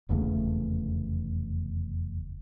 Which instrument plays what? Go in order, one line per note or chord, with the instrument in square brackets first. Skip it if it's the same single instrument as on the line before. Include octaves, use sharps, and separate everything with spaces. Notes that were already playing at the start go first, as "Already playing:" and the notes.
[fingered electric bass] F1 E2 C#3 A3